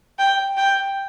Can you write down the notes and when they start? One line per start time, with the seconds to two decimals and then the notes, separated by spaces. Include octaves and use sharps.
0.19 G5
0.57 G5